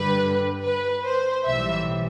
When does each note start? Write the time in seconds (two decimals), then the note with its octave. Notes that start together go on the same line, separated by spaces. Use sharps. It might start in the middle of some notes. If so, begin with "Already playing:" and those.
Already playing: G2 D3 G3 B4
0.64 B4
1.05 C5
1.46 B1 A2 E3 G3 E5